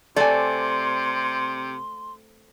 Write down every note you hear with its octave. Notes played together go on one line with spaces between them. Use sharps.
C3 A3 C4 D5 G#5 C6